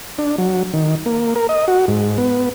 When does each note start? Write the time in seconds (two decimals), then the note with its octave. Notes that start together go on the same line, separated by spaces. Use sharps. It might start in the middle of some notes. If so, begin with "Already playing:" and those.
0.18 D4
0.38 F#3
0.74 D#3
1.06 A#3
1.36 A#4
1.49 D#5
1.68 F#4
1.88 G#2
2.18 B3